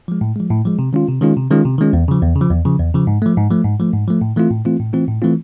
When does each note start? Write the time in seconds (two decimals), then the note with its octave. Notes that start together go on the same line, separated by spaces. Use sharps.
0.08 F3 G#3
0.21 A2
0.36 F3 G#3
0.51 A2
0.65 F3 G#3
0.79 C3
0.93 D#3 G#3 C#4 F4
1.08 C3
1.21 D#3 G#3 C#4 F4
1.37 C3
1.51 D#3 G#3 C#4 F4
1.65 C3
1.78 D#3 G#3 C#4 F4
1.93 E2
2.08 C#3 F3
2.23 E2
2.36 C#3
2.41 F3
2.50 E2
2.65 C#3 F3
2.79 E2
2.94 C#3 F3
3.07 G#2
3.22 F3 A3
3.37 G#2
3.51 F3 A3
3.64 G#2
3.80 F3 A3
3.94 G#2
4.08 F3 A3
4.21 A2
4.36 E3 A3 C4 F4
4.51 A2
4.65 E3 A3 C4 F4
4.80 A2
4.93 E3 A3 C4 F4
5.08 A2
5.22 E3 A3 C4 F4